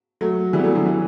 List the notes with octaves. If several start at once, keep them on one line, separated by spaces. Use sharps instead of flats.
F#3 A3
E3 G3
B3
F#3 A3
D3 F#3
E3